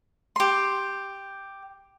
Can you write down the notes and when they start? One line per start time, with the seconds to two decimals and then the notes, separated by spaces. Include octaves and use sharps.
0.36 G4 C6